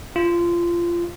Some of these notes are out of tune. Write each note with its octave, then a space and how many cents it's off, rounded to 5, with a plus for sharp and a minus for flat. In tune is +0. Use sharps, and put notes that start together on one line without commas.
F4 -20